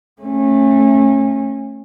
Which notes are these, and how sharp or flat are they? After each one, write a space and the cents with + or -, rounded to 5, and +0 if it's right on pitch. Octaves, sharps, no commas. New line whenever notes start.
A3 +0 C#4 -25